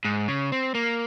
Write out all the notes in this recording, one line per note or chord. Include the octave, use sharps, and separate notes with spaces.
G#2
C#3
C4
A#3